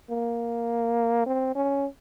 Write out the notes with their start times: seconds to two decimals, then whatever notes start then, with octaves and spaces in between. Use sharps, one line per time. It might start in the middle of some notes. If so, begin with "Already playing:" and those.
0.10 A#3
1.26 C4
1.55 C#4